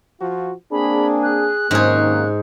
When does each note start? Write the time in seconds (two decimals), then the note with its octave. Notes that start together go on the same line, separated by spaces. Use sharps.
0.20 F3 F4 F#4
0.72 A#3 C4 D4 G#4 B5
1.23 F#6
1.71 A#1 G#2 C3 D#3 A#3 C#4 G#4